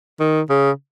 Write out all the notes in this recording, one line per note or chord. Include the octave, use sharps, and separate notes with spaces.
D#3
C#3